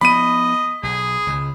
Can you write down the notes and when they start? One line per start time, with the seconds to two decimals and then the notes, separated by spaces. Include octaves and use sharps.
0.01 F3 B3 D#5 B5 D#7
0.83 B1 G#4
1.27 C#2 C#3